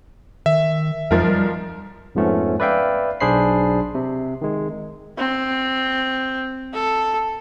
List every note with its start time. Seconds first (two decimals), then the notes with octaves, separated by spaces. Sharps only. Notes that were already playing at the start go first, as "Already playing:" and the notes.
0.46 D#3 E5
1.11 B1 F2 F3 A#4
1.28 G3
2.15 F2 G#2 F3 A3 B3 C#4
2.60 B4 D5 E5 F5 G5
3.20 B1 D4 G#4 C5 B5 C7
3.95 C3
4.42 D#3 G#3
5.18 C4
6.74 A4